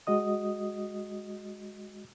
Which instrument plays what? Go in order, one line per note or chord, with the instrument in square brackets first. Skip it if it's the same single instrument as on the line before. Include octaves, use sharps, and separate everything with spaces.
[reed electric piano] G#3 F#4 D#5 D#6